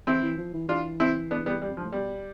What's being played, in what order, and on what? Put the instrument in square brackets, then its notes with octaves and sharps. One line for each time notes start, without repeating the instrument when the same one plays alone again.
[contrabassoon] E3 [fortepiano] C4 E4
[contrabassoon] E3
F3
E3
[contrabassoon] E3 [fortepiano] D4 F4
[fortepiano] C4 E4
B3 D4
G3 B3
[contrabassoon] E2 [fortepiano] G3
[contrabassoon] F2
[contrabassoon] G2 [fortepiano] F3
[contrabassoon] A2
[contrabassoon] B2 [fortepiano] G3